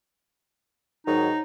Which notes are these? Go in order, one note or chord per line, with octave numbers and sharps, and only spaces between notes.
G#2 D#3 F#3 D#4